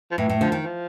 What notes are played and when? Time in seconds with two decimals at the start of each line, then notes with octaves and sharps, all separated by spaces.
0.11 F3
0.18 A2 E3
0.29 A2
0.41 D3 F3
0.52 D#3
0.64 F3